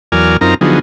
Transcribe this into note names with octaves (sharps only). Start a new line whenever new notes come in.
E2 F#3 A#4 D5 G#5 F6
F#2 C4 D#4 F4 A#4 A#5
D3 F3 F#3 B3 D#4 G#4